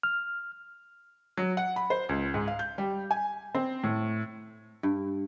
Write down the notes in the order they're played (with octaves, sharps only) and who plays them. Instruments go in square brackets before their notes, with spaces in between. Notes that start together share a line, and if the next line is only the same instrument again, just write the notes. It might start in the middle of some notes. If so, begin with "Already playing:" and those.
[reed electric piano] F6
[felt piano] F#3
F#5
B5
C5
C#2
G#2
F5
G6
G3
G#5
C4
A2
[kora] G2